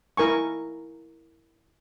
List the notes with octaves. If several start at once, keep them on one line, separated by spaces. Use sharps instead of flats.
E4 A#4 G#5 C#6